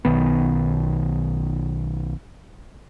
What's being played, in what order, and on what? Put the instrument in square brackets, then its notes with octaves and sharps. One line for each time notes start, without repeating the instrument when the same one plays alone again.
[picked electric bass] B1 D#3 B3